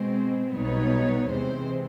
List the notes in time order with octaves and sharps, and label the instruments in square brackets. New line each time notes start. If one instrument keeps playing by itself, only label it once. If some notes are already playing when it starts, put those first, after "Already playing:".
Already playing: [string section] B2 G#3 C4 C5
B1 B2 G3 B3 D#4 C#5
E2 C3 E3 G#3 C4 C5